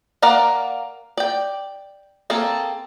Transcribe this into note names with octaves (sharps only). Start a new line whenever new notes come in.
A#3 A#4 D5 F5 F#5
D5 G5
A#3 C4 G#4 A4